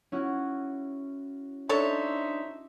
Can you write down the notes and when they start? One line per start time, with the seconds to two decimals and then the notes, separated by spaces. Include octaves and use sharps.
0.12 C#4 E4 F#4
1.69 D4 D#4 A4 C5 C#5 E5